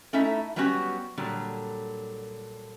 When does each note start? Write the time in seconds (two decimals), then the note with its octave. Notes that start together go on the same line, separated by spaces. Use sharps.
0.13 A3 C#4 D#4 E4 E5
0.56 F#3 G3 B3 C#4 F#4 G4
1.17 A#2 D3 F#3 G3